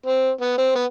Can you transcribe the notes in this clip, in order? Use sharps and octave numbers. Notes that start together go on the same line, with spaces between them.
C4
B3
C4
B3